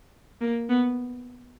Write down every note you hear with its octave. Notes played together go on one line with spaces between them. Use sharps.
A#3
B3